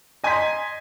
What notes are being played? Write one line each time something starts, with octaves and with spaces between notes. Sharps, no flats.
D#5 G#5 A#5 C6 G#6 B6